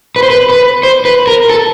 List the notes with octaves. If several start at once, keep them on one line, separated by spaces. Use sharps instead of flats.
B4
C5
B4
B4
C5
B4
A#4
A4